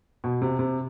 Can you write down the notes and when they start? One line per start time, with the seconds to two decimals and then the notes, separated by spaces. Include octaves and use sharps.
0.24 B2
0.42 C3
0.59 C3